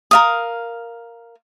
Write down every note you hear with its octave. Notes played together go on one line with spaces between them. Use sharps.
A#4 F5 D#6